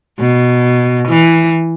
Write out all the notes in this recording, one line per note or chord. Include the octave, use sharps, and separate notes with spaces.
B2
E3